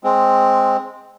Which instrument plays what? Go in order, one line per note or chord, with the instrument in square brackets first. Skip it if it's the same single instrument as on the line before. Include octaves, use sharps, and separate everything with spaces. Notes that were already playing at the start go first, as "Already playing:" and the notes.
[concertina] G#3 C4